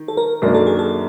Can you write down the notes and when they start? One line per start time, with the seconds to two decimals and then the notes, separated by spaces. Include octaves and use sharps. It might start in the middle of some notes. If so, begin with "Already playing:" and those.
Already playing: D#3
0.08 A4
0.17 A#4
0.42 F#2 D#3 F#3 A#3 D4 A#4
0.54 A4
0.67 G#4
0.79 A4